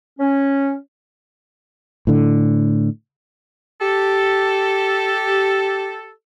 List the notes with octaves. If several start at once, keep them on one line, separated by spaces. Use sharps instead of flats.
C#4
A2 D3
G4 A4